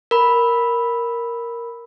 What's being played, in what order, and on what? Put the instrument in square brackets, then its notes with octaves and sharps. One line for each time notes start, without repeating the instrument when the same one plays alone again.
[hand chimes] A#4 B5